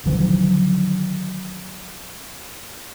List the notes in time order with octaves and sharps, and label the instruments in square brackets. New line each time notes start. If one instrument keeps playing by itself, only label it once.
[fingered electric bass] D3 D#3 F3 F#3